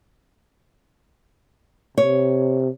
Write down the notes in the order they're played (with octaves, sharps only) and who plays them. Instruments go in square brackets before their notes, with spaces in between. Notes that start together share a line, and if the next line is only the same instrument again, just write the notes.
[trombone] C3 [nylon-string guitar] C#5